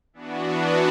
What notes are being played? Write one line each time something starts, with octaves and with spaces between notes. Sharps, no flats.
E3 B3 D4 F#4